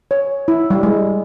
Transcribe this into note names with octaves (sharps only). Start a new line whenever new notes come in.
C#5
E4
G3
G#3